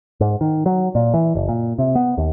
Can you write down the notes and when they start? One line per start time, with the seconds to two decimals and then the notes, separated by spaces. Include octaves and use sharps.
0.21 G#2
0.41 D#3
0.66 F#3
0.95 A#2
1.14 E3
1.35 F#1
1.49 A#2
1.79 C3
1.95 B3
2.18 D#2